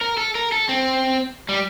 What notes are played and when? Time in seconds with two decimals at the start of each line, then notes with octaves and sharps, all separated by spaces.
0.01 A#4
0.17 A4
0.35 A#4
0.52 A4
0.69 C4
1.49 G3